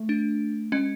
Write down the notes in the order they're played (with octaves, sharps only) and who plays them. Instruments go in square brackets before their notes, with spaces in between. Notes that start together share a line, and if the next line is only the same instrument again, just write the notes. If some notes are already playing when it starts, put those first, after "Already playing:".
Already playing: [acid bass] A3
[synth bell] D4
[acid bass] G#3 [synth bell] C#4